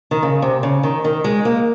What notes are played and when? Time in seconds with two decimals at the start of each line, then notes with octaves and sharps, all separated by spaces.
0.11 D#3
0.23 C#3
0.42 C3
0.63 C#3
0.83 D#3
1.04 D#3
1.24 G#3
1.45 A#3